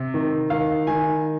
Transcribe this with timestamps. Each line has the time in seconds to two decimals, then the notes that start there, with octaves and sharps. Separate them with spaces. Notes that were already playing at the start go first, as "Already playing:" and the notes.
Already playing: C3
0.14 D#3
0.50 D#3 F5
0.87 D#3 G#5